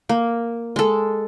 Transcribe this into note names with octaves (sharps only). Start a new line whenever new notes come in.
A#3
G#3 A4